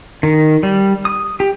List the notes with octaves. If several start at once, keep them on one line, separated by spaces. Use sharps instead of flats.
D#3
G3
D#6
G4